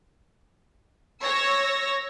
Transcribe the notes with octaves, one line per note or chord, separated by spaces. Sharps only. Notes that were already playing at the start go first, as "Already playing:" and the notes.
C#5 E6 A#6